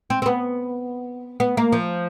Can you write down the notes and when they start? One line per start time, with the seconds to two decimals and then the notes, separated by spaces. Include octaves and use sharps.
0.10 C4
0.22 C4
0.26 B3
1.40 B3
1.57 A#3
1.72 F3